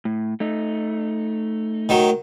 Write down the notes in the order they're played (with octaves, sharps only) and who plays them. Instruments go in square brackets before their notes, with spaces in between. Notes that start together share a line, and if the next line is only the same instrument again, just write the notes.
[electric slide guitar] A2
A3 D#4
[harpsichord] D#3 F#3